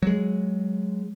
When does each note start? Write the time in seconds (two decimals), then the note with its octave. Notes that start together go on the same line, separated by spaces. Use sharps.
0.03 F#3 G#3